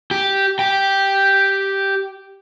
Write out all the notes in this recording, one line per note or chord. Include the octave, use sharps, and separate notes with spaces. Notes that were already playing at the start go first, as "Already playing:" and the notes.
G4
G4 G5